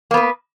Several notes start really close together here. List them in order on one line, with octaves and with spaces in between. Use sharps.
A#3 B3 B4